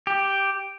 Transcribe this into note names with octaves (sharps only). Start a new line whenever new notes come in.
G4